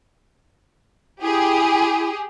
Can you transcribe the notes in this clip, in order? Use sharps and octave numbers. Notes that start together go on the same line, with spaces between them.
E4 G4 G#4